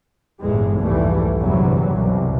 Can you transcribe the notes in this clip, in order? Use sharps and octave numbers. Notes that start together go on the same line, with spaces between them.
G1 E2 A2 E3 G#3
C2 F2 G#2 E3 G3 A3
G1 E2 C3 E3 F#3 G3
C2 F#2 B2